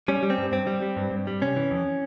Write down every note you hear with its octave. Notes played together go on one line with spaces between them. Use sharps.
G3 C#4
G3
C4
G2
G2 C4
G3
G3
G2
G2
G3
C3 C#4
E3
F2